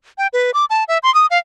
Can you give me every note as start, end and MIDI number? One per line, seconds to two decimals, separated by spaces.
0.18 0.27 79
0.33 0.51 71
0.54 0.65 86
0.70 0.84 81
0.88 0.98 76
1.03 1.13 84
1.15 1.26 87
1.30 1.38 77